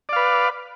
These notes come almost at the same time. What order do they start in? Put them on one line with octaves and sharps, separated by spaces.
D5 F5 B4